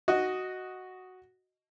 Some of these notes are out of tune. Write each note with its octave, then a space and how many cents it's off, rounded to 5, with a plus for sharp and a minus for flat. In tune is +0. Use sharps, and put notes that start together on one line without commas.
F#4 +0 D#5 +0